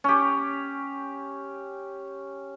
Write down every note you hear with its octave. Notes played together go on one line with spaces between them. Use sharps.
C#4 G4